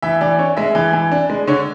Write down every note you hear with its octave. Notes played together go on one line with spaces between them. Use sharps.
E3 E5
E3 D5
D4 C#5
G#3 E5
E3
E3
D4
G#3
D3 C#5